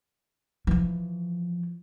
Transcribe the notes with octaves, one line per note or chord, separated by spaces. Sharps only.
E3 F3